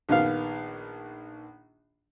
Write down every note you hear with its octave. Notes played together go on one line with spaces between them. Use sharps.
A#1 D#3 B3 F5